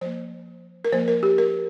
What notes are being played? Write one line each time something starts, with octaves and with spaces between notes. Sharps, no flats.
F3 A#3 C5
A#4
F3 A#3 C5
A#4
G4
A#4